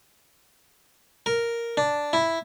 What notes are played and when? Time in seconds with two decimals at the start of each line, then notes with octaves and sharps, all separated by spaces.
1.26 A#4
1.77 D4
2.13 E4